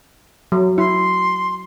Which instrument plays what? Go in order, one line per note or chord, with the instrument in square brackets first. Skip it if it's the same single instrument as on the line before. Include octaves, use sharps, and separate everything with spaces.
[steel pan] F#3
[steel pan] E4 [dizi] C6